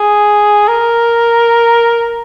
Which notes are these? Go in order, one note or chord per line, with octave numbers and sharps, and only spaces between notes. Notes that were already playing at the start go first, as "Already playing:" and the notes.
Already playing: G#4
A#4